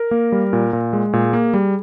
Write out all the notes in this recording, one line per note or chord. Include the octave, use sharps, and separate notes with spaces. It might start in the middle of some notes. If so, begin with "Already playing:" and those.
Already playing: A#4
A#3
G3
A#2
A#2
G#3
A#2 G#4
A#3
G3